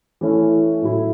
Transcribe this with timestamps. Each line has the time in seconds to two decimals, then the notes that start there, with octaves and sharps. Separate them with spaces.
0.21 E3 A3 C#4 E4
0.82 A2 F#3 A3 E4